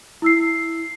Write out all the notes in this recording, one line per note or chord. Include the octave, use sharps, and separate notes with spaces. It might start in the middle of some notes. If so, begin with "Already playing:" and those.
E4 E6 C7